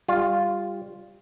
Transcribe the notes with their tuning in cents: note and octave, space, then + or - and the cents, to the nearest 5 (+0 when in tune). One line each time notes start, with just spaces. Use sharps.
G3 +15 F4 +0